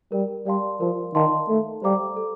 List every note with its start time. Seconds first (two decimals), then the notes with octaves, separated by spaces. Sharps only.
0.12 G3 A#4
0.46 G3 D5 F5 A5 C6
0.80 F3 A#4
1.14 D#3 D5 F5 A5 C6
1.48 A3 A4
1.82 G3 C5 F5 A#5 D6
2.16 A4